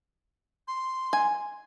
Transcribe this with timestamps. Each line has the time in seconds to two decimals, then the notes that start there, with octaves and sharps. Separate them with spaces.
0.68 C6
1.13 G#5